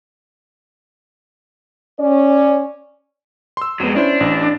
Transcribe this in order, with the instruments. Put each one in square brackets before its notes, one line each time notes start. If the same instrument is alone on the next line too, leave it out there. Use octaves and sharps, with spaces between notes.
[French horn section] C#4 D5
[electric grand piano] C6 E6
[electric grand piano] F2 B3 [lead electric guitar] F#3 G#3
[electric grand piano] C#4 E4 C5 [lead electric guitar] D4
[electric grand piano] A1